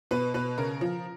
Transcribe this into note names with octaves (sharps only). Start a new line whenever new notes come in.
B2 B4
B2 B4
C#3 A#4
F3